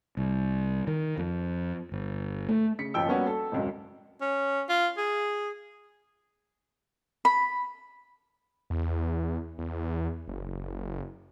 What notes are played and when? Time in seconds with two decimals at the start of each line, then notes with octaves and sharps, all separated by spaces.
0.17 C2
0.87 D#3
1.18 F2
1.92 G1
2.49 A3
2.79 C#3 B6 C#7
2.94 F#1 D#2 F3 G5 E6
3.07 G3 A#3 B3 C#4 F#4
3.27 A4
3.52 E1 C#2 F#2
4.21 C#4
4.69 F4
4.97 G#4
7.25 B5
8.70 E2
9.58 E2
10.28 F#1